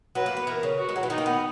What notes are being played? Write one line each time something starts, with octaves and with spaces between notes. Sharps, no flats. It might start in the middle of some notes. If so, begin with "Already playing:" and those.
F#3 B4
A#3
B3
E3 A#4
C#3
F#4
G#3
F#3
E3
D#3 D#4
A#3
B3